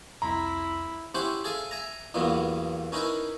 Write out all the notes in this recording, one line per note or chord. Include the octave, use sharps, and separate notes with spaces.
C2 F2 E4 A#5 C6
C#4 E4 G4 C5 E5 F#5
G#4 A4 E5 F5 G#5
E5 G#5 A#5
E2 G2 A#2 F#3 B3
C#4 D#4 E4 A#4 B4